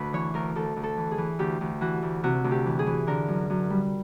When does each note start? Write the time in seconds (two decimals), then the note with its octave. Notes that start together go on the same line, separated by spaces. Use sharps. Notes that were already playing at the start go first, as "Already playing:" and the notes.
Already playing: D2 B4
0.13 E3 C#5
0.34 D2 A#4
0.55 D2 A4
0.76 D2
0.83 A4
0.97 E3
1.11 G#4
1.18 E3
1.39 D2 G4
1.61 D2
1.81 E3 F#4
2.02 D2
2.24 C3 F#4
2.44 D2
2.51 G4
2.66 E3
2.79 G#4
2.87 E3
3.07 D3 A#4
3.28 F#2
3.50 F#2
3.70 G3